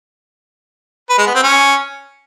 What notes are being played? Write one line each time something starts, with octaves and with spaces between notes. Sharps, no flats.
B4
G#3
B3
C4
C#4